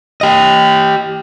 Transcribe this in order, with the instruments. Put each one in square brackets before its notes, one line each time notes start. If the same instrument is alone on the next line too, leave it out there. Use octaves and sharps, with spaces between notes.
[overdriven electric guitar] G4 D#5